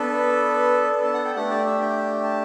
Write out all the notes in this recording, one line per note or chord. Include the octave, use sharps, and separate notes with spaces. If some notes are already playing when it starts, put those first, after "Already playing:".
Already playing: B3 D4 A4 B4
B4
A5
F#5
G5
A3 D4 G4 F#5
D5
E5
G5
A5